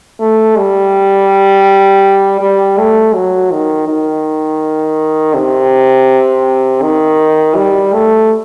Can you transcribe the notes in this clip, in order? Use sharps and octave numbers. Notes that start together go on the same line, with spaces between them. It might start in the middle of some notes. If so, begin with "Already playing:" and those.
A3
G3
G3
A3
F#3
D#3
D#3
C3
D#3
G3
A3